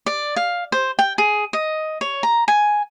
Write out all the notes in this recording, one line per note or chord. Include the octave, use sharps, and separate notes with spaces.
D5
F5
C5
G5
G#4
D#5
C#5
A#5
G#5